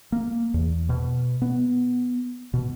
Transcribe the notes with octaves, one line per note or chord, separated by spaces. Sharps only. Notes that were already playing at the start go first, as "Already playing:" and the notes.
A#3
E2
B2
B3
B2